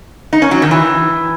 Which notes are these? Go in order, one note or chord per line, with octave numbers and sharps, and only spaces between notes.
D#4
C#4
F#3
D#3
E3